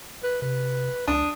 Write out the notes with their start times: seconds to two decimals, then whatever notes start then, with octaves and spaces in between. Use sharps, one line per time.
0.23 B4
0.42 C3 B4
1.08 C#2 D4 D#6